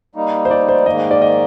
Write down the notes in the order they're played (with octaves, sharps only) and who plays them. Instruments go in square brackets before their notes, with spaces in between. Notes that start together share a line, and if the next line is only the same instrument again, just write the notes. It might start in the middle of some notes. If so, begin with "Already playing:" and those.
[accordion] G3 A#3 D#4
[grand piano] C5
D5
C5
[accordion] G#2 D#3 A#3 [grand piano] D#5
[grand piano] D5
D#5